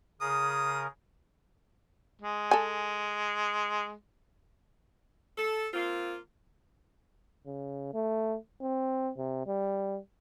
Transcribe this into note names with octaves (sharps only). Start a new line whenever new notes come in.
C#3 G#4 A#4 D#6
G#3
A4 G#5
A4
A#3 C4 F4
C#3
A3
C4
C3
G3